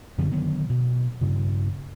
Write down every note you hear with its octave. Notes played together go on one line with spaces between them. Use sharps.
F#2 D3 F3 B3
D3 D#3 F#3 B3
B2
G2 C#3